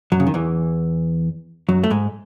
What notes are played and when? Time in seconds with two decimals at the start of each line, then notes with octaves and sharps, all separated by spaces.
0.12 F#2 F#3
0.20 C#3
0.27 D#3
0.34 E2 E3
1.69 F#2 F#3
1.84 A3
1.90 G#2 G#3